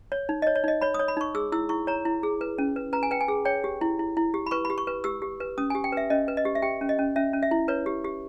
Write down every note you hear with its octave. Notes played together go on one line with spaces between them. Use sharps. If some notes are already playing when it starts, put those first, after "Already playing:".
C#5
D#4
C#5 D#5
C#5
D#4 D#5
C#5 B5
C#5 D#6
B5
D#4 C#6
G#4 E6
E4 E6
E4 C#6
C#5 A#5
E4
G#4
B4
C#4
B4
B4 A#5
G#5
B4 G5
G#5
G#4
C#5 G5
G4
E4
E4
E4
G4
B5
B4 C#6
B5
G4
C#6
B4
G4 E6
G4
B4
C#4 D#6
G4 G#5
G5
B4 E5
C#4 D#5
B4
D#5
G4
E5
G4 G5
C#4
D#5
C#4
C#4 E5
C#4
E5
E4
B4 C#5
G4
G4